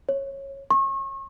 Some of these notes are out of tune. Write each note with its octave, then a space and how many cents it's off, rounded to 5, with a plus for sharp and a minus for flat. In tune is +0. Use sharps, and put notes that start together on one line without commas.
C#5 -15
C#6 -35